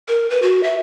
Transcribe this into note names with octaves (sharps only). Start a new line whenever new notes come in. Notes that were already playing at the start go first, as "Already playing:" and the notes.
A#4
B4
F#4
E5